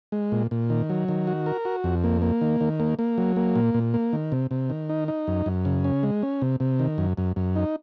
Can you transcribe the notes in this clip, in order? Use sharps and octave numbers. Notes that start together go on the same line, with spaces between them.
G#3
A#2
A#2
D#3
F#3
D#3
F#4
A#4
F#4
F2
A#3
A#3
D#3
D#3
A#3
A#3
F#3
A#3
A#2
A#2
A#3
D#3
C3
C3
D#3
D#4
D#4
F#2
F#2
C#3
C#4
G#3
C#4
C3
C3
D#3
F#2
F#2
F#2
D#4